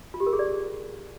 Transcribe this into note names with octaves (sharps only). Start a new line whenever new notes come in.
F4
G4
A#4
G#4
D5